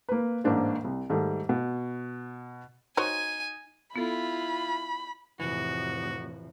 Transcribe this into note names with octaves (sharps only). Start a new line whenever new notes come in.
A#3 B4
A1 G#2 A#3 D4 C5
C2
G#2 D#3 G3 A3
B2
D#4 F#4 C5 C#5 G#5
B3 E4 F4 A4 B5
F1 A2 E3 F#4